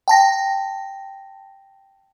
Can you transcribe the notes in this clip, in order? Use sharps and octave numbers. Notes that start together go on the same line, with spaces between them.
G5 A5 A#6